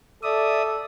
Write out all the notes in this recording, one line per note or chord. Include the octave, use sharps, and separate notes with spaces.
A4 D5 E5 D#6